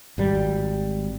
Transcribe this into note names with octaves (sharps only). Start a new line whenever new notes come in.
G#1 G3